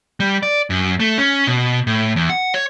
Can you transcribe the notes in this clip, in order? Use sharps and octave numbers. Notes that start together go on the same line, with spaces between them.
G3
D5
F#2
A3
C#4
B2
A2
E2
F#5
C#5